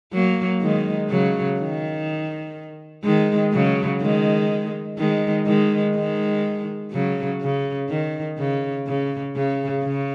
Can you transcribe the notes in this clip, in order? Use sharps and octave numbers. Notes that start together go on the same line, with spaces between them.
F#3 A#3
D#3 G#3
C#3 F#3
D#3
D#3 G#3
C#3 F#3
D#3 G#3
D#3 G#3
D#3 G#3
D#3 G#3
C#3 F#3
C#3
D#3
C#3
C#3
C#3
C#3